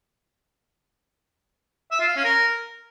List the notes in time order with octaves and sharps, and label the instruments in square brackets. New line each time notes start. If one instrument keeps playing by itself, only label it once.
[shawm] E5
F4
F5
C#4
A#4